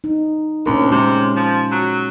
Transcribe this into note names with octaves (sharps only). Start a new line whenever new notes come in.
D#4
D2 A#2 C#4 A#4
C3 G#3
F3
F#3